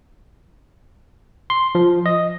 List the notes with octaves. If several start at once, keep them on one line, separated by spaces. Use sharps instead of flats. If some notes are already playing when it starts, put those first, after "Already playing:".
C6
F3
D#5